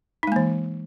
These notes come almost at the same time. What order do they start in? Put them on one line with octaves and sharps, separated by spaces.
D#4 G#3 A#3 E3